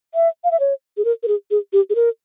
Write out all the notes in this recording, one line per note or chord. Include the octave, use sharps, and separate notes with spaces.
E5
F5
E5
C#5
G#4
A#4
A#4
G#4
G#4
G4
G#4
A#4